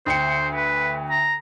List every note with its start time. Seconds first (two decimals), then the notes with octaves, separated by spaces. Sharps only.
0.06 D2 C5 G5 C#7
0.55 B4
1.10 A#5